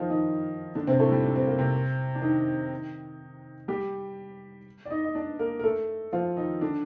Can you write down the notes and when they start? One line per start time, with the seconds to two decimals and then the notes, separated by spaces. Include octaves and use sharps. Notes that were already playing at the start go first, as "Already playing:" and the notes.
Already playing: D#3 F3 D#4 F4
0.10 D#3 D#4
0.75 D3 D4
0.87 C3 C4
0.99 A2 A3
1.11 G3
1.25 D4
1.36 C4
1.47 A#3
1.59 C3 C4
2.15 D4
2.22 D#3 D#4
3.68 G3 G4
4.85 D5
4.90 D#4 D#5
5.04 D#5
5.15 D4 D5
5.39 A#3 A#4
5.59 A#4
5.64 A3 A4
6.13 F3 F4
6.37 D#3 D#4
6.61 D3 D4